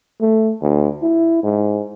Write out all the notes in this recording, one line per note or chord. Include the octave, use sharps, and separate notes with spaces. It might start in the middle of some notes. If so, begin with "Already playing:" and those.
A3
D2
E4
G#2